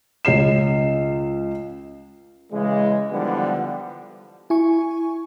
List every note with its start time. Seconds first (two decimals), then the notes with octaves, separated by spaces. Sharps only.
0.25 C#2 C#4 C7 E7
2.52 C#3 E3 G#3
3.12 D3 E3 F3 G3 B3
4.50 E4 G#5 C#6